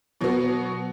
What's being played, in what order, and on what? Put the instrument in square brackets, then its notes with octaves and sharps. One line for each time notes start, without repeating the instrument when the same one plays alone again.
[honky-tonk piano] B2 F#3 B3 F#4